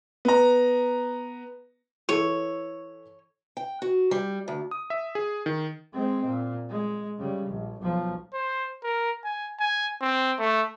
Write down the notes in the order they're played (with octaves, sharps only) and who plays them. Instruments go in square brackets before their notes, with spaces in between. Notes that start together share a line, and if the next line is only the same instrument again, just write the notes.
[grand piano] B3 A#5
[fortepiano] E3 A4 C#6 [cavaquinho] C#5
[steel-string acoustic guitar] G5
F#4
G3
D2
[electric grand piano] D#6
E5
G#4
D#3
[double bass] G#3 C4
A#2
G#3
C#3 G3
A#1
B1 F3
[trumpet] C5
A#4
G#5
G#5
C4
A3